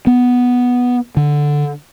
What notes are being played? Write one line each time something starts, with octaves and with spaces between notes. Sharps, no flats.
B3
D3